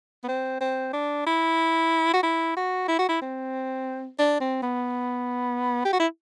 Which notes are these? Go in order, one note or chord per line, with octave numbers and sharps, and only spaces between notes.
B3
C4
C4
D4
E4
F#4
E4
F#4
E4
F#4
E4
C4
D4
C4
B3
G4
F#4
E4